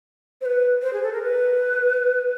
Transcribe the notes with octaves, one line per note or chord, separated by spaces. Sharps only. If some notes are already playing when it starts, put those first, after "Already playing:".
C5
B4
C5
G#4
A4
A#4
B4